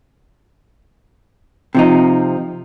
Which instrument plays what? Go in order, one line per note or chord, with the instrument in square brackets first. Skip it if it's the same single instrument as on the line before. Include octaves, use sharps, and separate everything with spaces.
[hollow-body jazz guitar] C3 F3 D#4